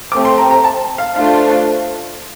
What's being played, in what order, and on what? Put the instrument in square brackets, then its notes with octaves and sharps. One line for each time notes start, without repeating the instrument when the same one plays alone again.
[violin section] A3 C4 G4 [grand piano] D6
[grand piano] C6
A#5
A#5
A5
F5
[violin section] A3 D4 F4 C5 [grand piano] F5